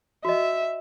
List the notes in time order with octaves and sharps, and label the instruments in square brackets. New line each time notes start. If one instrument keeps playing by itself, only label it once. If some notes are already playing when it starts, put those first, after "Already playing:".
[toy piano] F#4 D#5 [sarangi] E5